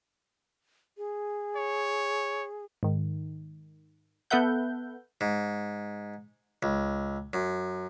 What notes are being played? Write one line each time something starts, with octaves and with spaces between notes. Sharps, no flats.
G#4
C#5
G#2 D#3
B3 A4 B4 E5 F#5 G6
G#2
C#2
F#2